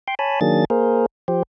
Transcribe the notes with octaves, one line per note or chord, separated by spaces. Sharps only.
G5 C6
C#5 G#5 A5 B5
D#3 F#3 A#3 D4 G#4 A6
A#3 G#4 A#4 C5
F3 G4 C5